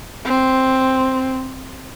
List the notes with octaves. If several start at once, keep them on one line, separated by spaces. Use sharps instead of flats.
C4